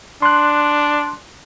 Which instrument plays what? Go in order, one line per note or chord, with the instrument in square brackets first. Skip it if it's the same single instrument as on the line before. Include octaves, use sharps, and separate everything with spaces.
[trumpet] D4 [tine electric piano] C6 F#6